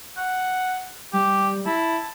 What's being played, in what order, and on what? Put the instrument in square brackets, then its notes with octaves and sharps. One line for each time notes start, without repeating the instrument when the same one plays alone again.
[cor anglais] F#5
[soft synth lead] G3 [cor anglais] G4
[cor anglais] E4 [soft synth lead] A5